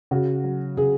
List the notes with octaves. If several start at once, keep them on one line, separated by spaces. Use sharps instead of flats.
C#3 F#4
F#3
C#3 G#4